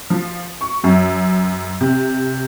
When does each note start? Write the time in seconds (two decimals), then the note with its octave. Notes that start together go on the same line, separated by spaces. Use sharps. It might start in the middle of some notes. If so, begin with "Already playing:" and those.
0.10 F3
0.61 C#6
0.84 F#2
1.81 C3